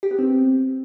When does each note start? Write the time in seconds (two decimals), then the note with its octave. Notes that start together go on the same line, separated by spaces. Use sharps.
0.03 G4
0.11 B3
0.19 C4